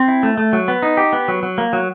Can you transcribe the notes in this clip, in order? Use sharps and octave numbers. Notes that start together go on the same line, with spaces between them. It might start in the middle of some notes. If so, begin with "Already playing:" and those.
Already playing: C4
E4
A3
A3
F#3
B3
D#4
G4
B3
F#3
F#3
A#3
F#3